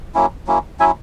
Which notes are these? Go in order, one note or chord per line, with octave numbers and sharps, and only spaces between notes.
F#3 A#3 C#4 E4
F#3 A#3 C#4 E4
F#3 C#4 E4 E5 G#5